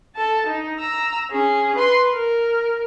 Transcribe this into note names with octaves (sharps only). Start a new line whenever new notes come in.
A4 A5
D#4
A#5 E6
C#4 G#4
B4 C6
A#4